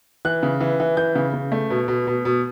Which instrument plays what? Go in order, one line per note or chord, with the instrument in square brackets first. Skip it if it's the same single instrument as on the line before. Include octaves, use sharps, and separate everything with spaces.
[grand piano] E3 F#6
C#3
E3
E3
E3 G6
C#3
C#3
A3
B2
B2
B2
B2